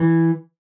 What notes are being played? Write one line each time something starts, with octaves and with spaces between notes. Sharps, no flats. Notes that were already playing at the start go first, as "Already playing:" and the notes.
Already playing: E3